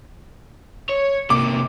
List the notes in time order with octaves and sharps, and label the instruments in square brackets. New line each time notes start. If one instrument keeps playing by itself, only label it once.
[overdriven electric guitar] C#5
[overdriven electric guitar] C3 A#3 [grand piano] D6